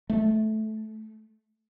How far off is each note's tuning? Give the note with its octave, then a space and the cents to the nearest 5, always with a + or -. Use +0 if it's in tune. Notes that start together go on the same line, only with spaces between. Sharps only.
A3 -15